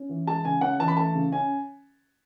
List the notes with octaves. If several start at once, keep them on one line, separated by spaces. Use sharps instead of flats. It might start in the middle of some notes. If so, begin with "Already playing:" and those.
Already playing: C#4
E3
G#3 A5
C#3 G#5
C#4 F#5
E3 A5
B5
A3 A5
C#3
C#4 G#5